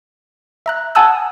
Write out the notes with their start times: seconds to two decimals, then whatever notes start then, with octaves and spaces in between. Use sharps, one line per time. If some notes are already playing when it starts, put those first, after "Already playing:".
0.66 E5 A#5 F#6
0.95 F#5 G#5 A5 D#6 E6 F#6